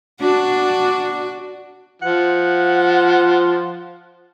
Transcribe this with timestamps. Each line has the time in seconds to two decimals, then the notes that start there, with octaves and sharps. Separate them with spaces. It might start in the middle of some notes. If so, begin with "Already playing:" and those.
0.21 D4 F#4
2.02 F3 F#5